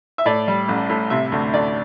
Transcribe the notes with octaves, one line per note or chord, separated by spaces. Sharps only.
E5
A2 D5
G3
A1
A2
C3 E5
D2
D2 D5